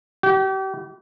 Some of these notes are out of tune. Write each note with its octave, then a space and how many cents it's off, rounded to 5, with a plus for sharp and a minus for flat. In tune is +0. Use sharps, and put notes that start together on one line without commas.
G4 -35